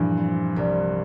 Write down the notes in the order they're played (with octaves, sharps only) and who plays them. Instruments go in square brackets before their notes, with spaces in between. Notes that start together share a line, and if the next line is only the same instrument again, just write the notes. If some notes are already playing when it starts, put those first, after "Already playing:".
Already playing: [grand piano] G2 E3 [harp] A#2 F3
[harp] C4
C2